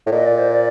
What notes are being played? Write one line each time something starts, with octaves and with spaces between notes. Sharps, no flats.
A2
A#2 D#5
D5
C5
D5